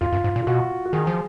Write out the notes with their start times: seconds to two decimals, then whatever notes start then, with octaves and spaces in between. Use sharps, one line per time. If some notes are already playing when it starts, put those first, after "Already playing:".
0.01 F2 F4
0.13 F#2
0.24 G#2
0.36 A#2
0.42 F4
0.47 B2 F#4
0.86 F#4
0.93 D#3 G#4
1.07 F3